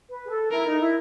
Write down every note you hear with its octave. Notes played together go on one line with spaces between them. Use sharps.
B4
G#4
A4
E4 A#4
D#4
E4